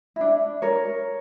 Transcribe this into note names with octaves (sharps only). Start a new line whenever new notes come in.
E4
D4
A#4 C#5